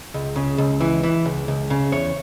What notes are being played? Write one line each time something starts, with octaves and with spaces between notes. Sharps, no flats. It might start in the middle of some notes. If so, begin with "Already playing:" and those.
C#2
C#3
C#2
E3
E3
C#2
C#2
C#3
E2 C#5